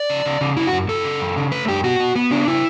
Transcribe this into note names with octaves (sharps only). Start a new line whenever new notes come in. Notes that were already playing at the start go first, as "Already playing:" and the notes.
Already playing: D5
C#3
C#3
C#3
F#2 E4
F#4
F#2
F#2 A4
C#3
F#2
C#3
A3 B4
F#2 G4
B3 F#4
B3
B3
C#3 D4
C#3 E4